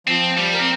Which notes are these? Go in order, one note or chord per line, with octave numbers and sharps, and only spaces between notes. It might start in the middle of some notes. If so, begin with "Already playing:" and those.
F3 C4
G3
A#4
C4